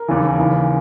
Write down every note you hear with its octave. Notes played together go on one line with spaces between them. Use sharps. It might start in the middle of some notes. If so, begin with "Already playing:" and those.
Already playing: A#4
D#2 C#3 E3
D#2 C#3 E3